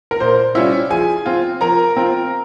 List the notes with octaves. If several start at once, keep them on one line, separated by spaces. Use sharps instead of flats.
A#4
A#2 C5
G3 C#4 E4 F4 E5
F3 G#4 G#5
C4 F4
F3 A#4 A#5
C4 F4